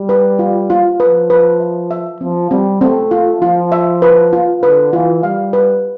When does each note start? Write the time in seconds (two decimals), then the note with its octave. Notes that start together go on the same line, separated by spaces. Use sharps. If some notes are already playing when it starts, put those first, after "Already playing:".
Already playing: G3
0.09 B4
0.39 F4
0.70 F4
1.00 F3 B4
1.30 B4
1.60 E5
1.91 E5
2.20 F3 C4
2.51 G3 C4
2.81 A3 C4
3.11 F4
3.42 F3 F4
3.72 E5
4.02 B4
4.33 F4
4.63 D3 B4
4.93 E3 F4
5.23 G3 F5
5.53 B4